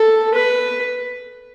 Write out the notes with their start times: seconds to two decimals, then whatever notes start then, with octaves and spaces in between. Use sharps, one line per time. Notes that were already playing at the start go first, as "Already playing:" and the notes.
Already playing: A4
0.35 B4